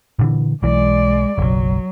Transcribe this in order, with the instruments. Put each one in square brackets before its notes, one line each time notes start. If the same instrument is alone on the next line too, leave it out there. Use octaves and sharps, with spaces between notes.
[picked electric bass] A#2 D3 E3
[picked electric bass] B1 E3 [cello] G#3 D5
[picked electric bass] F#1 B1 [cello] F#3